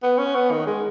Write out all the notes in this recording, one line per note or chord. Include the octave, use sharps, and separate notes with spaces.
B3
C#4
B3
D#3
G#3